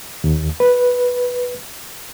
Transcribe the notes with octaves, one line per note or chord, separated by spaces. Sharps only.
D#2
B4